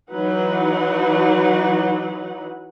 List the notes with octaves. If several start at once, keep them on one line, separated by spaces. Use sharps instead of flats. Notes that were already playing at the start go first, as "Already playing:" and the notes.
E3 F#3 D#4 B4 F#5